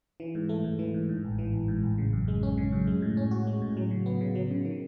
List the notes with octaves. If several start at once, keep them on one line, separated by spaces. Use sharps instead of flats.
E3
G#2
A3
G#2
E3
G#2
G#2
A1
E3
A1
G#2
A1
C#3
F#2
G#3
C#4
C#3
F#2
G#3
A2
C#4
F#4
G#3
A2
F#3
C#3
B3
C#3
F#3
C#3
D#3